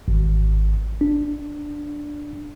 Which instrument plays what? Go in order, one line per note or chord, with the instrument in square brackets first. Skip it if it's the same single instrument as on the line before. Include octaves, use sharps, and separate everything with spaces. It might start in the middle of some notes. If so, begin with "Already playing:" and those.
[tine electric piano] G#1
D4